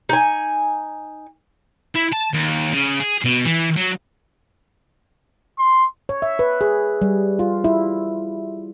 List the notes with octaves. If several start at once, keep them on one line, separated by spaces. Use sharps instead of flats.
D#4 G#5
E4
A5
D#2
C#3
G#4
B2
E3
F#3
C6
C#5
E5
B4
G#4
G3
F4
E4